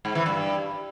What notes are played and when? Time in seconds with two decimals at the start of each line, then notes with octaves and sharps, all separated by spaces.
0.05 G#2
0.15 E3
0.26 G2